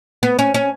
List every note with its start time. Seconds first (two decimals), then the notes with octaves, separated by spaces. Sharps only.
0.23 B3
0.39 C#4
0.54 C#4